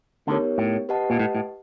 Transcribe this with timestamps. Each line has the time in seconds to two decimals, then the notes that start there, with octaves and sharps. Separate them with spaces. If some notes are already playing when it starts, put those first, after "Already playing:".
0.27 D2 D3 B3 D#4 G4 A#4 C#5
0.58 A2
0.89 G4 B4 D#5 F#5 A5
1.10 A#2
1.19 A2
1.35 A2